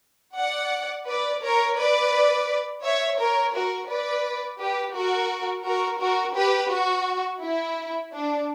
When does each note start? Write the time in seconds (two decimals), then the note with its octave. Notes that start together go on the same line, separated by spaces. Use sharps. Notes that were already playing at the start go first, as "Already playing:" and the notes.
0.36 D5 F#5
1.06 B4 D5
1.43 A#4 C#5
1.77 B4 D5
2.83 C#5 E5
3.19 A#4 C#5
3.53 F#4 A#4
3.88 B4 D5
4.60 G4 B4
4.95 F#4 A#4
5.65 F#4 A#4
6.00 F#4 A#4
6.36 G4 B4
6.71 F#4
7.41 E4
8.12 D4